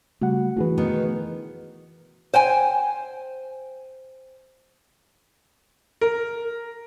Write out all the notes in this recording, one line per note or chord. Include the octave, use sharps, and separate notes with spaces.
C#3 G3 A3 F#4 F#5
E3 A3 C#4 D4 E4 F#4 G#4 B4
B2 D#3 B3
C5 G5 G#5
A#4